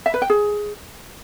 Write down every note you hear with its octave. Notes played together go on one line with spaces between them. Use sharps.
E5
B4
G5
G#4